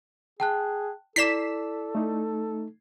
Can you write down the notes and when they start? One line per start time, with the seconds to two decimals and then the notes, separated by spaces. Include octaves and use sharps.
0.40 G#4 G5 A5 F#6
1.16 E4 A4 D5 D6 B6 C7 E7
1.95 A3 D#4